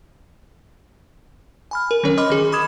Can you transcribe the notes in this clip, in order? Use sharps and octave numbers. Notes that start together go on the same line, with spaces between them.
G#5 B5 F6
A#4
D#3 F#3 C#4 A#4 C#5
D#5 B5 C6 D6 F6
D#3 G#4
B5 D6 D#6 G#6 E7